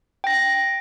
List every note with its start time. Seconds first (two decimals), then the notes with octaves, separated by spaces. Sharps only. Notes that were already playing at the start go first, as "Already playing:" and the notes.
0.24 G5 A#6